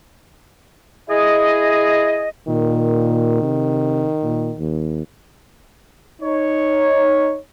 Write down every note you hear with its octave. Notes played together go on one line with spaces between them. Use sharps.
E4 G#4 D#5
A#2 D#3
C3
A#2
D#2
D#4 C#5